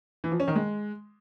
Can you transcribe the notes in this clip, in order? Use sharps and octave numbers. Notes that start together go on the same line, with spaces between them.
E3
F3
C#4
D#3
G#3